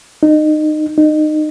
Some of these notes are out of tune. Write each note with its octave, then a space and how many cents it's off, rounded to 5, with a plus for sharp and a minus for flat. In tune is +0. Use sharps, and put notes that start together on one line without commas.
D#4 -25
D#4 -25